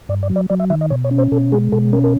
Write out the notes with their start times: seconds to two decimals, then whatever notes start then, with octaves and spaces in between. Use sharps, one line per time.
0.09 G2 D5
0.23 D5
0.29 F#3
0.36 D5
0.50 F#3 D5
0.60 E5
0.70 D#3 E5
0.81 D#5
0.90 B2 C#5
1.04 C#5
1.11 C#4
1.18 C5
1.32 B2 A4
1.52 G#3 G#4
1.72 B2 A4
1.93 C#4 A#4
2.04 A#4